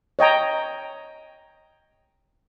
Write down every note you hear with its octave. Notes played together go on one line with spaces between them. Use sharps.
C#5 D#5 G5 A#5